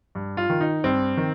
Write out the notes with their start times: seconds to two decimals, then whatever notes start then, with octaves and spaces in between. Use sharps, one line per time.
0.15 G2
0.37 F4
0.50 D#3
0.61 D#4
0.84 G2 C4
1.17 D#3